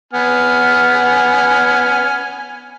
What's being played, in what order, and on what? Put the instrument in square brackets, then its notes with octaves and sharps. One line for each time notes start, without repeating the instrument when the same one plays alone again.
[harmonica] B3 G#5 F6